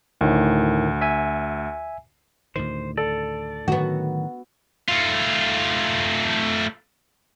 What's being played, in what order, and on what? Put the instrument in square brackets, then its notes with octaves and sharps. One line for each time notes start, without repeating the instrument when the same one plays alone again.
[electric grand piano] D2 [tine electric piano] A2 D#3
[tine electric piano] E5 G#5
[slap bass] D2 A2 D#3 [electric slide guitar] C5
[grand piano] A4 [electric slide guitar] D5
[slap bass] A2 D3 F#3 [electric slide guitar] D#3 [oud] B3 F#4
[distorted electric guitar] A3 F4